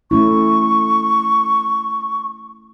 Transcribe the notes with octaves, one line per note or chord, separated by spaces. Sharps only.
A3 C#4 E4 C#6